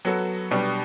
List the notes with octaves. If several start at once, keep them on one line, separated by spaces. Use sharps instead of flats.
F#3 B3 F#4 A4
B2 G3 D4 G4